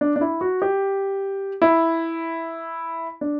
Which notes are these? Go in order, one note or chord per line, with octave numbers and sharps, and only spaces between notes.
D4
D4
E4
F#4
G4
E4
D4